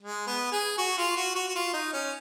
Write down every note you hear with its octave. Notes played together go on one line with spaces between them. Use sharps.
G#3
B3
G#4
F#4
F4
F#4
F#4
F#4
F4
D#4
C#4